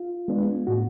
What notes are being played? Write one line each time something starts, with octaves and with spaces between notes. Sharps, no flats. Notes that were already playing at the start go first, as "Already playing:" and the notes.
Already playing: F4
G#3 B3 D4
A2 F#4